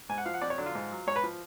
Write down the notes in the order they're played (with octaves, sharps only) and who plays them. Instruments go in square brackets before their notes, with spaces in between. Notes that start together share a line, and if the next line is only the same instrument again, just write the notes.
[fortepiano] G#2 G#5
F#5
F3 F5
F#5
F2 D5
C#5
D3 F#3 D4
F4
G#2
F#3
G#2 C#5
B4
F3